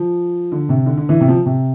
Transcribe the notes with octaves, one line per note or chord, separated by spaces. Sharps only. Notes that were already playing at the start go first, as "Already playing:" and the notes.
Already playing: F3
D3
C3
D3
D3
E3
C3
F3
C3